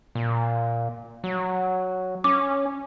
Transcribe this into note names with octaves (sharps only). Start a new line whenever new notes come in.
A#2
F#3
C#4 D6